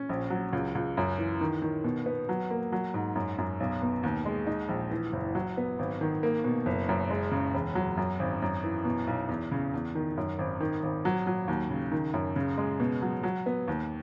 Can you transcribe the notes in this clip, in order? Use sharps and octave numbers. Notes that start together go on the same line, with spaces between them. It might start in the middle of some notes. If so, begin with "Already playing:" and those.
Already playing: C#4
A#1
F#3
C#2
C#2
F#2
E3
D#3
D#3
B2
B3
F#3
A#3
F#3
G#2
F#2
F#2
B1
B2
D#2
G#3
D#4
A#1
E3
F#1
F#3
B3
G#1
D#3
A#3
B2
F#1
F#2
G#3
C#3
E1
F#3
F#2
G#1
F#2
E3
B2
B1
E2
C#3
E2
D#3
F#2
G#1
D#3
G#1
F#3
F#3
D#2
C#3
D#3
F#2
C#3
G#3
B2
F#3
F#3
B3
D#2